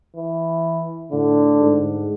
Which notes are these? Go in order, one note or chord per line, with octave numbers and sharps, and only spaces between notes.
E3
A2 D3
G#2